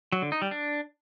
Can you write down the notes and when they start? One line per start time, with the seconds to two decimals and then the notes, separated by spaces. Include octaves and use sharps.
0.12 F#3
0.22 D3
0.32 D#4
0.42 G3
0.51 D4